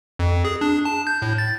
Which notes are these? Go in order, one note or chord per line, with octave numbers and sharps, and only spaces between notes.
F2
G#4
D4
A5
G6
A2
A6